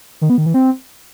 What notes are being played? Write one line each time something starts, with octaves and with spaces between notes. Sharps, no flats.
D#3
B3
D#3
E3
C4